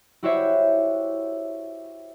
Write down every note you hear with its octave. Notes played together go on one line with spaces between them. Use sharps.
E4 F#4 G4 C5 C#5 E5